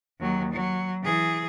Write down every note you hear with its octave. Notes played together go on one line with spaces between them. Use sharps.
D#2 F#3
F#3
E3 G#4